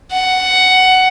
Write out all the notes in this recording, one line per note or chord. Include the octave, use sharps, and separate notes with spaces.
F#5